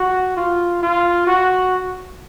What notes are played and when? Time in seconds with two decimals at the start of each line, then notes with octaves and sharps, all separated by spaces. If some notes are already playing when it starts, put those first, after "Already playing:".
Already playing: F#4
0.37 F4
0.83 F4
1.27 F#4